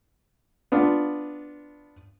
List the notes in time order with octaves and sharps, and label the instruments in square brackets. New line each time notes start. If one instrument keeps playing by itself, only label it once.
[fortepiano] B3 D4 F4